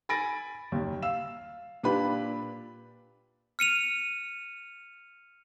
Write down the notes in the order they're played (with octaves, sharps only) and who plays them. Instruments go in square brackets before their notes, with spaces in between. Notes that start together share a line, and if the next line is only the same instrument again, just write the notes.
[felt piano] G#5 B5 A6 A#6 D7
F#1 D#2
F5 E6 E7
A#2 D4 F4 G4 B4 B5
[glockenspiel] F6 C#7 D#7 F7